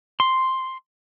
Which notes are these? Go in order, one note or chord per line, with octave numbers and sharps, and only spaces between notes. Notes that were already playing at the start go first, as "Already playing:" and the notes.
C6